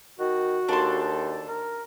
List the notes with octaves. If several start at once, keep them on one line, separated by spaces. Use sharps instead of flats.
D#3 F#4
D#2 D4 A4 C6
A#4